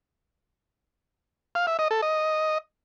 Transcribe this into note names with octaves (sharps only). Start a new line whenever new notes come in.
F5
E5
D#5
A4
D#5